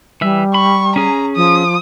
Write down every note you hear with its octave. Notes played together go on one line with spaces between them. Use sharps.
E3 G3 E5
B5 C#6
C#4 G#4 A#5
F3 D#6